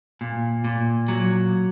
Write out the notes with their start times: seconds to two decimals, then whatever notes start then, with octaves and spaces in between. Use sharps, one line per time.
0.21 A#2
0.65 A#2
1.08 F#3